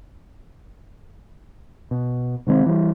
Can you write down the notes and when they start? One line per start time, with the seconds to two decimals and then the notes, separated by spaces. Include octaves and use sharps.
1.91 B2
2.47 C3 D#3 G#3 C4
2.66 E3 G3